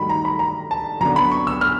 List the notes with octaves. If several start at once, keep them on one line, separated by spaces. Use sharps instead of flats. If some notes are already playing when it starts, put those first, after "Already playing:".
Already playing: G2 D#3 F#3 A3 B5
A#5
B5
A#5
A5
F#2 D3 F#3 B3 D4 A#5
B5
C#6
E6
F6